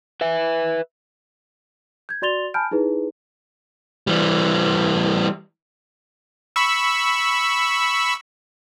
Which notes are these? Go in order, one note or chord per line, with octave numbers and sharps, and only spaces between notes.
B4 E5
G6 G#6
F#4 D5 C6 A6 F7 G7
G#5 A5 B5 F6 G6 D7
D#4 E4 G#4 B4
E3 G3
B5 C#6 E6